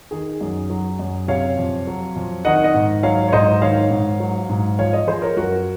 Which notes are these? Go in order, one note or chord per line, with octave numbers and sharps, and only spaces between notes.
D#3 G#4
F#2
F#3
F#2
C3 C#5 F5
F2
F#3
F2
D#3 D#5 F#5
D#5 F#5
G#2
F#3 C#5 F5
C#5
G#2 C5 D#5
D#3 C#5 F5
G#2
F#3
G#2
F3 C#5 F5
C5 D#5
F3 G#4 C5
A#4 C#5
F#2 F#4 A#4